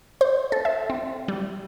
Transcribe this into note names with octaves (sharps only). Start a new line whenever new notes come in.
C5
A4
E5
C4
G3